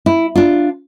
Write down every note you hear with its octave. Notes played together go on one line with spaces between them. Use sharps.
E4
D4 F4